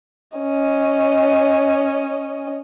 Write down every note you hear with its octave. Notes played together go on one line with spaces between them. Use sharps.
C#4 D#5